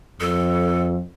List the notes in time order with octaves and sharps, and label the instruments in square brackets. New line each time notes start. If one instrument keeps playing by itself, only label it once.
[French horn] F2 [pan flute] A4